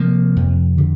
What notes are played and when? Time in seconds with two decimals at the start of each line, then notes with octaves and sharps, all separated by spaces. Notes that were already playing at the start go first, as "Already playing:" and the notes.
Already playing: C3 F3 A#3
0.36 F2
0.78 D3